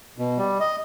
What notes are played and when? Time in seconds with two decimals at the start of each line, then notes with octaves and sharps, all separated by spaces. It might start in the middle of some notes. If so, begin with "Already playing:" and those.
0.18 B2
0.38 G3
0.60 D#5